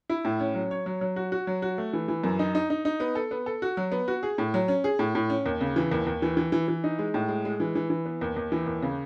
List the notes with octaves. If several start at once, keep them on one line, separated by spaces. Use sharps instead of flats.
E4
A2
C#4
F#3
C#5
F#3
F#3
F#4
F#4
F#3
F#4
A3
E3
E3
F#2
D#4
D#4
D#4
D#4
B3
A4
B3
A4
F#4
F#3
B3
F#4
G#4
A2
F#3
C#4
G#4
A2
A2
C#4
D#2
C#3
E3
D#2
D#2
E3
E3
E3
E3
D#4
G#3
A2
G#3
G#3
E3
E3
E3
B3
D#2
D#2
E3
D#2
C#3